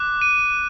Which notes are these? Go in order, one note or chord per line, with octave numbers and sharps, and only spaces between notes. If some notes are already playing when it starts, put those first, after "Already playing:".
Already playing: D6 F#6
D#7